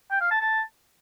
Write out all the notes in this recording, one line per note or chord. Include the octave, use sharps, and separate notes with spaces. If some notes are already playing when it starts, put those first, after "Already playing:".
G5
F5
A5
A5